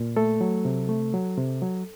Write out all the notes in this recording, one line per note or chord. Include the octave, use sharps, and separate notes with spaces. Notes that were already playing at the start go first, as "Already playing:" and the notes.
Already playing: A#2
A3 A4
F#3
C3
A3
F#3
C3
F#3